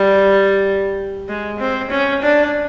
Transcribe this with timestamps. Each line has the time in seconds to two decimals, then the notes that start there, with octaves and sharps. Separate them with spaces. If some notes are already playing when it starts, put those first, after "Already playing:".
Already playing: G3
1.28 G#3
1.59 C4
1.91 C#4
2.23 D4